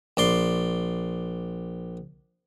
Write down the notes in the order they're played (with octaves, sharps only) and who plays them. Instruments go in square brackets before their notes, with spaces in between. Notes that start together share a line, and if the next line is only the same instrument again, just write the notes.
[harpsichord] A#1 D5 C6